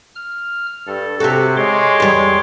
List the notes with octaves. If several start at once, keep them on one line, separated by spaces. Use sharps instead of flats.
F6
G2 A4
C3 C4 F#4 G4 A4
G#3 C#5 C6 D6
E2 G3